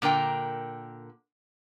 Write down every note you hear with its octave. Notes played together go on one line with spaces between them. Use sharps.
A#2 D3 A#4 G5